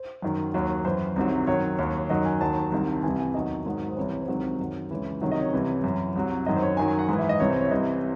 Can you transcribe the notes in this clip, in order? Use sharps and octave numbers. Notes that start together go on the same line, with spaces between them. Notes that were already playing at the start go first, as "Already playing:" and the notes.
Already playing: C5
F#2 D#3 F#3
D#2 D#3 F#3
F#2 E3 C5
C2 C3 D#3 F#3
F#2 D#3 F#3 C#5
D#2 D#3 F#3
F#2 D#3 F#3 D#5
G#5
D#2 D#3 F#3 A5
C2 C3 D#3 F#3
C2 C3 E3 G#5
G#5
E2 D#3 F#3 D#5
G#2 D#3 F#3
C5
C2 C3 E3 C#5
C#5
C5
C#2 C3 D#3 F#3
C5
F#2 D#3 F#3
C#2 C#3 E3
C2 C3 D#3 F#3 C#5
D#5
C#5
C2 C3 E3
F#2 E3
C2 C3 F#3
F#2 D#3 F#3 D#5
C5
C#5
F#2 D#3 F#3 G#5
G#5
F#5
G#2 E3
E5
D#5
C2 C3 E3 C#5
C5
C#5
E5
C2 C3 E3 D#5